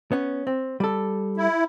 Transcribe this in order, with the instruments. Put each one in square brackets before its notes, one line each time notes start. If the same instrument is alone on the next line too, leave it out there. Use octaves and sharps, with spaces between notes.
[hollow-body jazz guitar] B3 C#4
C4
G3 A4
[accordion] E4